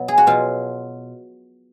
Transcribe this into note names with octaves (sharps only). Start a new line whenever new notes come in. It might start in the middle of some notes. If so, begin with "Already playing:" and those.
Already playing: B2 F#3 B3
G#4
F#4
B2 F#3 F4